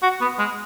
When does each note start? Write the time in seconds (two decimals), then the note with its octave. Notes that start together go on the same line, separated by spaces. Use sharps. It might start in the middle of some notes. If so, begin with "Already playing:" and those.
0.03 F#4
0.21 B3
0.39 G#3